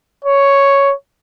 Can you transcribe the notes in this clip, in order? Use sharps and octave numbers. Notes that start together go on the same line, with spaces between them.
C#5